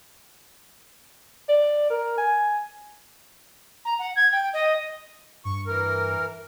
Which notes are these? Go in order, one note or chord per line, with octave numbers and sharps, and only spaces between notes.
D5
A#4
G#5
A#5
F#5
G#6
G5
D#5
G2 C#6
E3 A#4